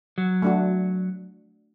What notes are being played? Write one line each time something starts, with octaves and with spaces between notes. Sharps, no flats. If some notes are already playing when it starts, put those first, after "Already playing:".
F#3
A3 D4 F#4